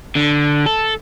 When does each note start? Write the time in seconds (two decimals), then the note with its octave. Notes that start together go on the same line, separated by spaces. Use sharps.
0.16 D3
0.66 A4